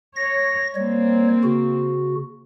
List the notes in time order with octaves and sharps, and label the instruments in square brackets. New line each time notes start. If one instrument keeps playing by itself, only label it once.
[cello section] C#5 [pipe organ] A#6
[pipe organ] G3 C#5 [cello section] A#3 C4
[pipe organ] C#3 F#4